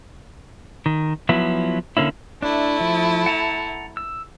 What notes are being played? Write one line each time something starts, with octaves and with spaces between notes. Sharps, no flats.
D#3
F3 F#3 B3 E4
D3 A#3 C#4 E4
A3 D4 E4
F3
F#5 A5 A#5
E6